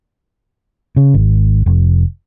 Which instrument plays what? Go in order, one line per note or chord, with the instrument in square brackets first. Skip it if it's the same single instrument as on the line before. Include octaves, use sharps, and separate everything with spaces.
[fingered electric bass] C#3
G#1
F1